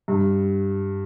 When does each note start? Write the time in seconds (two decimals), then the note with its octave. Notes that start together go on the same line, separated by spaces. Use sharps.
0.08 G2